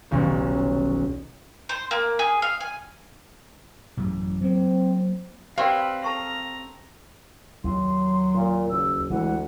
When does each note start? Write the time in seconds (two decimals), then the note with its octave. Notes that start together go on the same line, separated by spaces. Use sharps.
0.11 D#1 B1 C#4
1.69 C5
1.91 A#3
2.19 G#4
2.42 F5
2.61 G#5
3.97 A1 F#2
4.42 F#3 A#3 C4
5.58 C4 G4 B4 D5 F5 G5
6.04 A4 A5 A#5 C#6
7.64 D#2 F#3 C6
8.34 A#2
8.70 F#1 E6
9.10 D2 E3 G#3 F#5